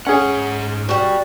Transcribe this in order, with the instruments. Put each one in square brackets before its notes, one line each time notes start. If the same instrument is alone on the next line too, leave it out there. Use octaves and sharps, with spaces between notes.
[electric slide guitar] G#2 F#5 [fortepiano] C#4 G#4
[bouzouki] G3 F#4